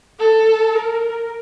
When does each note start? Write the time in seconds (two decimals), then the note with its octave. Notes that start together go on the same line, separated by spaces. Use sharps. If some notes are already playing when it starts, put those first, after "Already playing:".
0.20 A4
0.75 A#4